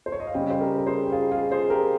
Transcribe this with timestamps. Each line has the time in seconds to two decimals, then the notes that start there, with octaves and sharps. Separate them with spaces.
0.06 C5
0.12 C#5
0.20 D#5
0.27 F5
0.34 C#3 G3 D#5 G5
0.50 C5
0.60 G4 A#4
0.78 A#4
0.87 G#4 C5
1.06 G4
1.12 F4 G#4
1.31 F4 G#4
1.51 G#4 C5
1.70 G4 A#4